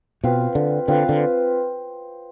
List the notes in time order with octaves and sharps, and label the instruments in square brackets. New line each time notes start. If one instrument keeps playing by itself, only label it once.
[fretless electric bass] B2 [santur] C4 F4 B4 F5
[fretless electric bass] D3
[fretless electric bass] D3 [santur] C4 F4 B4 F5
[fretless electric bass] D3